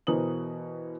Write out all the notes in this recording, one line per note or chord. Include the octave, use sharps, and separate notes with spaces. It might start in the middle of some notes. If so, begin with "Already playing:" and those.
B2 E3 A#4 C5 D#6 F#7